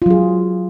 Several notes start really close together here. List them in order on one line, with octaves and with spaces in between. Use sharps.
F4 F#3 G#4